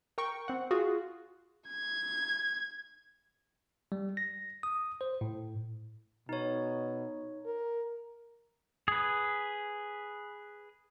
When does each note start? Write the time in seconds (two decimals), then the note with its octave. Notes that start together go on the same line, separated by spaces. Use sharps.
0.18 A#4 G5 C#6
0.48 C4 F#5
0.71 F4 F#4 G#4
1.69 G#6
3.92 G3
4.17 A#6
4.63 D#6
5.01 C5
5.21 A2
6.29 B2 D#4 C#5
7.46 A#4
8.88 G#4 B4